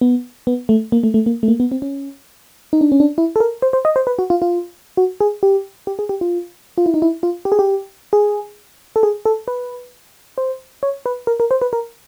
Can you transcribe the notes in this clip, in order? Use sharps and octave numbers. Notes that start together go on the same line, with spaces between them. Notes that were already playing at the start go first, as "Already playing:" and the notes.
B3
B3
A3
A#3
A3
A3
A#3
A3
A#3
B3
C4
C#4
D#4
D4
C#4
D4
E4
A4
A#4
C5
C5
D#5
C5
B4
F#4
F4
F4
F#4
G#4
G4
G4
G#4
G4
F4
F4
E4
D#4
E4
F4
G4
G#4
G4
G#4
A4
G#4
A4
B4
C5
C#5
B4
A#4
A#4
C5
B4
A#4